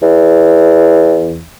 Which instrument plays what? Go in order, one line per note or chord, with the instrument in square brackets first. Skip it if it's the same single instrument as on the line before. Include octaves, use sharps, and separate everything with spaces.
[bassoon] E2